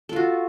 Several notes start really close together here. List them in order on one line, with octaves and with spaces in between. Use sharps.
A4 F4 F#4